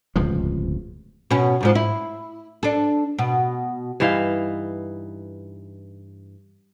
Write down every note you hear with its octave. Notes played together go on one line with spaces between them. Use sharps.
D1 C#2 G2 F3
B2 C#4
F2 G#2 F3
E4
D4 A4
B2
G2 E3 D#4 F5